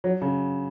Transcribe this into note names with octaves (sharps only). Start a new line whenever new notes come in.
F#3
C#3